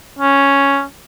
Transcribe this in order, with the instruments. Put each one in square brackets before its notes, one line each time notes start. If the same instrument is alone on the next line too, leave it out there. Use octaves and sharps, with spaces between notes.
[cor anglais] C#4